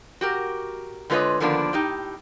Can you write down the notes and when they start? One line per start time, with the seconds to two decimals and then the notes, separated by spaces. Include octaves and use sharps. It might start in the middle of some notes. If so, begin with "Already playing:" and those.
0.21 F#4 G4 A#4
1.10 D3 G#3 F4 B4 C#5 D#5
1.40 D3 D#3 F3 A#3 B3 D4
1.73 A2 D#4 G4